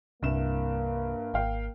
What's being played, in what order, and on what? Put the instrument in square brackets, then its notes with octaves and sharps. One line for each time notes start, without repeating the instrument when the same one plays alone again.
[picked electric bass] C2 [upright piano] G2 E5 E7 [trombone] A#3
[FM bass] G#1 [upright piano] F5 G5